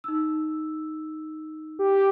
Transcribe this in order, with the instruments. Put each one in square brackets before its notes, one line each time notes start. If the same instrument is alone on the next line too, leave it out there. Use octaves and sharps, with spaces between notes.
[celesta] D#4 E6
[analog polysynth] G4